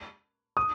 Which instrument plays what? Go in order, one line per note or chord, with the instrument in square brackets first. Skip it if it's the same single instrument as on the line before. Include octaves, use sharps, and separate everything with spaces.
[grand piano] D#6